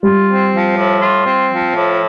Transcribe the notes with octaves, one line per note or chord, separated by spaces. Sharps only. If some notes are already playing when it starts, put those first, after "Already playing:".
G3 F4
C4
F3
A2
F4
C4
F3
A2